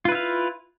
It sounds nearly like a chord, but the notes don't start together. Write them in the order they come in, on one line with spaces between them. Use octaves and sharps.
F4 B4 E4 F5